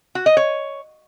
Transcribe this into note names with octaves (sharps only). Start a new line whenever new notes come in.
F#4
D#5
C#5